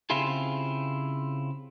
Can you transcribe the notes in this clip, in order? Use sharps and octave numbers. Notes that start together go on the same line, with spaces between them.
C#3 C4 E4 F4 G4 G#4